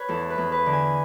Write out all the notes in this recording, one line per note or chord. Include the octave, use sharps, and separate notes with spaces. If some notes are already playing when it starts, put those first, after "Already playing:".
Already playing: B4 C#5
E2 A4
B4
E2
B4
D3
G#5